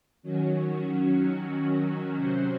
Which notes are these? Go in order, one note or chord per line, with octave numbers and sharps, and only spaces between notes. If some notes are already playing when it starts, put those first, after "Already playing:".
D#3 F#3 C#4 F#4
C3 F#3 C#4 F#4 C5